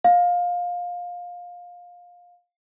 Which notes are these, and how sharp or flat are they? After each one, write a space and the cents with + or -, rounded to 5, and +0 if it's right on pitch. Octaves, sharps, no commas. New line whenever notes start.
F5 +20